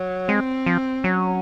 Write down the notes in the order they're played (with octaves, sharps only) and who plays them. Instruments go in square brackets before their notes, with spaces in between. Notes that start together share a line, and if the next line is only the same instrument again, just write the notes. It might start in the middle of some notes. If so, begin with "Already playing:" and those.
Already playing: [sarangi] F#3
[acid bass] G#3 [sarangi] C4
[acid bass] F3
[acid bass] F#3 [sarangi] C#4